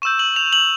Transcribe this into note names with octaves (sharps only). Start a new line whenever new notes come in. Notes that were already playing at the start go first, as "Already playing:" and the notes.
C#6 E6 G6 E7
F#7
F7
F#7